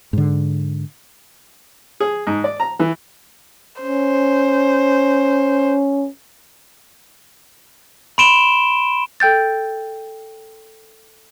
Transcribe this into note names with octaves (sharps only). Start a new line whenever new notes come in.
G#2 D3
G#4
G#2
D5
A#5
E3
C#4 C5
B5 C6 D7 E7 G7
A4 G5 G6 A6